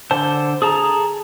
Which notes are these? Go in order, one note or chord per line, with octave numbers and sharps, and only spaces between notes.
D3 C5 A5
G#4 A4 A5 A#5